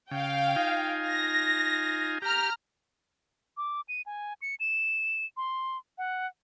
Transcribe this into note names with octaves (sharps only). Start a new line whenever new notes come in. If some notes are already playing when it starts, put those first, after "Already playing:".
C#3 F5 G5
D#4 F4 G#5
A#6
G4 A#5 F6
D6
D#7
G#5
C#7
E7
C6
F#5